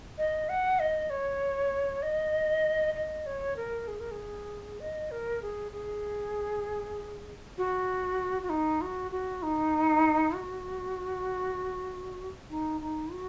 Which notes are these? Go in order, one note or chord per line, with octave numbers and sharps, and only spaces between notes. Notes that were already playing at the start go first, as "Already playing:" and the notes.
D#5
F#5
D#5
C#5
D#5
D#5
C#5
A#4
G#4
A#4
G#4
D#5
A#4
G#4
G#4
F#4
F#4
D#4
F#4
F#4
D#4
F#4
D#4
D#4
F#4